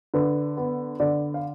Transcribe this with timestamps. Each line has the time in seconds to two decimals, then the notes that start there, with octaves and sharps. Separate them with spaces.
0.14 D3 B4
0.57 B3
1.00 D3 D5
1.34 F5